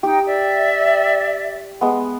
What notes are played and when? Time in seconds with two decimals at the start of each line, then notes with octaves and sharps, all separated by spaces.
0.03 D#4 G4 G5
0.27 D5 E5
1.81 G#3 B3